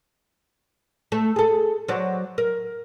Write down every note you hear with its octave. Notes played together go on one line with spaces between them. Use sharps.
A3
G#4 A4
F#3 C5 D5
A#4